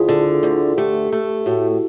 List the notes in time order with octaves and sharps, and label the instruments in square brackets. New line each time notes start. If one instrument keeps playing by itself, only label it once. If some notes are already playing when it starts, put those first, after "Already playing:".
Already playing: [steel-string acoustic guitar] D2 [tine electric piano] E4 F4 G#4
[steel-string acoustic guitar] D3
D2
[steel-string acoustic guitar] A3 [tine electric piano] G4
[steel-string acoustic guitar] A3
[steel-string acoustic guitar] A2 [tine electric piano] F#4